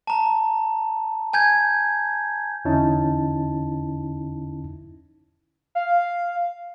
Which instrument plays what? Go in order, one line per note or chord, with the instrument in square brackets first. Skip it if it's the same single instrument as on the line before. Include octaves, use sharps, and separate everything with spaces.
[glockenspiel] A5 A#5
G#5 G6 G#6
[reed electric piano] E2 D3 C#4 D#4 E4 A5
[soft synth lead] F5